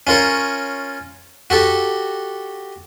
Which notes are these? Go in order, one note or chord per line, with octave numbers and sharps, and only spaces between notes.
C#4 F4 A#4 C#5
F#4 G4 A4